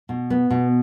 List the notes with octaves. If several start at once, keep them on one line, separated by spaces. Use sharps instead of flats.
B2
B3
B2